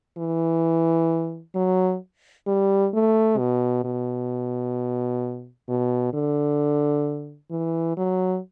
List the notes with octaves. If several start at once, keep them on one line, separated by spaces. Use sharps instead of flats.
E3
F#3
G3
A3
B2
B2
B2
D3
E3
F#3